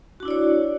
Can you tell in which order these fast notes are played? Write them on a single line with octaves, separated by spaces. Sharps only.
F#4 D4 E4 D5 C#5